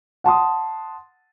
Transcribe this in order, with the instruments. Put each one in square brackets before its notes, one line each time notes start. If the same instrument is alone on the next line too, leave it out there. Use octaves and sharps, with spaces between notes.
[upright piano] F#5 A5 C6 D#6